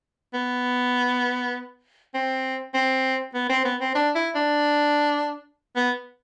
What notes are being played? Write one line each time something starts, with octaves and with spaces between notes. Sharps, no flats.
B3
C4
C4
B3
C4
B3
C4
D4
E4
D4
B3